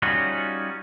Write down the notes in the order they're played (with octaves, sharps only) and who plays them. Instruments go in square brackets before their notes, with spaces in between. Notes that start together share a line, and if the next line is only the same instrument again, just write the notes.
[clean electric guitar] G3 C#4 D#4 F4 F#4